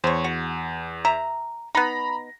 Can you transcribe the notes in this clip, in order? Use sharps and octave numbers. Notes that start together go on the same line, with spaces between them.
E2 C5 C#5
F#4
E5 A#5
B3 D#4 A#5 B5 A#6